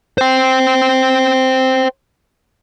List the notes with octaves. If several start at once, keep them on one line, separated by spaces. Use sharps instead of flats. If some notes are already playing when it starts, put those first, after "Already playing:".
C5 G5